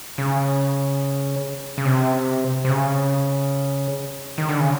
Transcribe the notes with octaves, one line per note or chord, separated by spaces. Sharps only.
C#3
C#3
C3
C3
C#3
D#3
D3
C#3